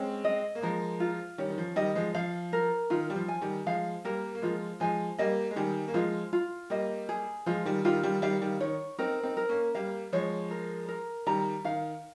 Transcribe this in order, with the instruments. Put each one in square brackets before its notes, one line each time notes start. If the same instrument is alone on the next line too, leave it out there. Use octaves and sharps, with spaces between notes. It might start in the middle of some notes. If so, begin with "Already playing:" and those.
Already playing: [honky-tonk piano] G#3 C4 [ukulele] C#4
[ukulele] D#5
[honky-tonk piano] A#3
[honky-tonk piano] F3 G#3 [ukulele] A#4
[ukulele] F4
[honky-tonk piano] D#3 G3 [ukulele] C#4
[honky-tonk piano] D#3
F3
[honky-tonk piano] D#3 G3 [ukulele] D#5
[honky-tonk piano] F3 G#3
[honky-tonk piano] F3 [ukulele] F5
[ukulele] A#4
[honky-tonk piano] D#3 [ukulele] F4
[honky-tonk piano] G3
F3
[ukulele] G#5
[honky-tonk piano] D#3 G3
[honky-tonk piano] F3 G#3 [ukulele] F5
[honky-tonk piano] G3 A#3 [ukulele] A#4
[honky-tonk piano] A#3
[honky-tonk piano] F3 G#3 [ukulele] F4
[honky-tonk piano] F3 G#3 [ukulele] G#5
[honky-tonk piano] G3 A#3 [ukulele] D#5
[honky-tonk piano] G#3
[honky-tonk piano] D#3 G3 [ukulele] G#4
[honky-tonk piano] A#3
[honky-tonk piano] F3 G#3 [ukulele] F4
[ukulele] F4
[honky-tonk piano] G3 A#3 [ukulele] D#5
[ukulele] G#4
[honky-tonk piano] F3 G#3 [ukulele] F4
[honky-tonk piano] D#3 G3
[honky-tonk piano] D#3 G3 [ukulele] F4
[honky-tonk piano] D#3 G3
[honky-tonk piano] D#3 G3 [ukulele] F5
[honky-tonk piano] D#3 G3
[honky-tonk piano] D#3 [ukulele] C#5
[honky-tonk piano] C4 D#4 [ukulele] A#4
[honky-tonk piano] C4 D#4
[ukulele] A#4
[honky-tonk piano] A#3 C#4
[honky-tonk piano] G3 A#3 [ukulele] F5
[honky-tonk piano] F3 G#3 [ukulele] C#5
[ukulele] A#4
A#4
[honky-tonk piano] D#3 G3 [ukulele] A#5
[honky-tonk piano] D#3 [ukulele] F5